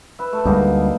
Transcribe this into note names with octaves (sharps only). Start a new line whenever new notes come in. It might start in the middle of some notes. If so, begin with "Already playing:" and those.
B4 E5
A3 A4
D2 G3 G#3 A#3 D#4